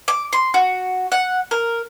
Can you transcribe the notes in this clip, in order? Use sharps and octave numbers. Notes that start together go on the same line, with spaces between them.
D6
C6
F#4
F#5
A#4